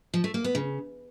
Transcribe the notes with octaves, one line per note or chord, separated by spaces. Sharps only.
F3
A3
A#3
B3
C#3